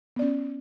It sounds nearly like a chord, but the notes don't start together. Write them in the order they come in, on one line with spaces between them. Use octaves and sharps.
B3 D5 C#4